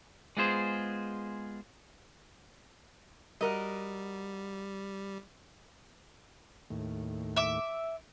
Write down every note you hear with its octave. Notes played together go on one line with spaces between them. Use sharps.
G#3 B3 F4 G#4 C5
G3 F#4 A#4 D#5
D#2 A2
E5 D6